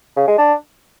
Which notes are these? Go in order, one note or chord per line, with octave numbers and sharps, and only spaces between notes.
C#3
G#3
D4